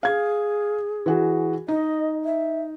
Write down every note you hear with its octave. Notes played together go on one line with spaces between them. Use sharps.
G#4 F5 G#6
E3 F#4 G#4
D#4 D#5
E5